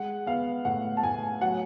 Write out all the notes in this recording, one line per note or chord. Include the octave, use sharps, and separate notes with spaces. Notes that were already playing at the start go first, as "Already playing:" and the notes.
Already playing: G#3 F#5
B3 F5
A2 F#5
A5
A2 G#5
F#3 F#5